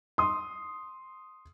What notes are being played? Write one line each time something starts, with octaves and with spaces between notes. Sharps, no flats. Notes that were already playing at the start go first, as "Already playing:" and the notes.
C6 D#6